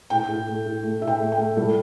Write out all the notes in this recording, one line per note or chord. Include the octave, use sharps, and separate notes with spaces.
A2 G5
A2
A3
A2
A3
A2 E5
G5
A3
G5
A3
G3 A4